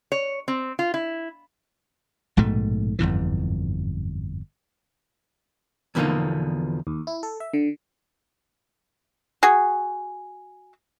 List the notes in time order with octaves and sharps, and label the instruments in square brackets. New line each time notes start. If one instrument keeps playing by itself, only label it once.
[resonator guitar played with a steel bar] C#5
C4
F4
E4
[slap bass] A#1 G#2 B2 A3
G1 F2 G#2 E3
[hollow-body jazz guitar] E2 B2 D3 F3 A#3 D#4
[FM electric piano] D#2
E4
A4
E5
D3
[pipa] F#4 G#4